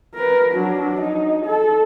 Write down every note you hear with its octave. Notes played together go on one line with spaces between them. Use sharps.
A#4 B4
F#3 D4
D#4
A4